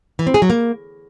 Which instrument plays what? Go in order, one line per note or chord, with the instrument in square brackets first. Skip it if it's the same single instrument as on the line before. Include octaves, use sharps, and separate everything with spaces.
[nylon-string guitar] E3
C4
G#4
F#3
A#3